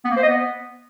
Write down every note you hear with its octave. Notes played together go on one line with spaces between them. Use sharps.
B3
A#3
C5
D#5
B3